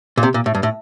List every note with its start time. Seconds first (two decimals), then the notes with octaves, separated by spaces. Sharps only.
0.17 A#2
0.23 C3
0.34 A#2
0.46 A2
0.55 G2
0.63 A2